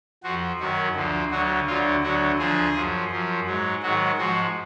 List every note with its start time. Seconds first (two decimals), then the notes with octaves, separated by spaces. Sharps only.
0.24 F2 F3 F#4
0.59 F#2 D#3 F#3 F#4
0.95 D2 D3 F3
1.31 D2 D3 F#3 F#4
1.67 D2 D3 F#3 F4
2.03 D2 D3 F#3 F#4
2.38 D2 D3 F3 G#4
2.75 F#2 F3
3.11 F#2 F3
3.46 G#2 F#3
3.83 G#2 D#3 F#3 F#4
4.18 G#2 F3 F#4